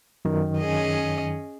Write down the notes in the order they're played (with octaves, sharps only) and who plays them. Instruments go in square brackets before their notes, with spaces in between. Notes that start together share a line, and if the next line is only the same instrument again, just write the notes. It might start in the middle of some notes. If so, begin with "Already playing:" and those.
[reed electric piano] F#2 D#3
[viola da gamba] C#4 G#4 D#5